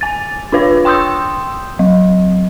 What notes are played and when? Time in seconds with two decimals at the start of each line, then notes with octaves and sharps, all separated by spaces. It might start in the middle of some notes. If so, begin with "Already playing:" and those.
0.01 G#5 A6
0.52 D4 F4 B4 C#5
0.85 G5 C6 D#6 E6 G6
1.79 F#3